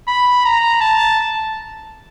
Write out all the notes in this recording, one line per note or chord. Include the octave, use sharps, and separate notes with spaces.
B5
A#5
A5